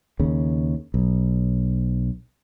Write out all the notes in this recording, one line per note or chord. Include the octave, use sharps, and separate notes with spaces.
D#2 C#3
B1